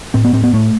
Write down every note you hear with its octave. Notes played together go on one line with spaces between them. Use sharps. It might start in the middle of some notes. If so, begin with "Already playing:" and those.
A2 C4
B3
A2 C4
B3
A2 A3